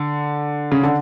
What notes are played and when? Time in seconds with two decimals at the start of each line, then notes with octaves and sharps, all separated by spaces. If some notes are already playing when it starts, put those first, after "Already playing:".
Already playing: D3
0.72 C#3
0.83 D3